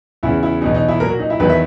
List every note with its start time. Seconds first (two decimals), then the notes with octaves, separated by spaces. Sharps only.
0.23 E2 C#3 E3 E4
0.43 E4
0.62 E2 B2 F#3 D#4
0.74 D#4
0.88 E4
1.00 A#2 F#3 A#4
1.10 F#4
1.19 D#4
1.30 E4
1.40 E2 D#3 F#3 B4
1.50 E5